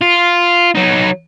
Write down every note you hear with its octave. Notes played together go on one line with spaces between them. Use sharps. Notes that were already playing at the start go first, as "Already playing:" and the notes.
F4
F#3 D#4